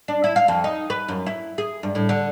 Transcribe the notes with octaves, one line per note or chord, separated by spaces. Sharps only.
D4
E4
F5
F2
D#4
B4
F#2
E4
G#4
G2
A2
D3